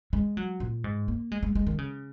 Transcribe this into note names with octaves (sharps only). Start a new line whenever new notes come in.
G#3
F#3
A#2
G#2
A#3
G#3
G#3
G#3
D#3
C#3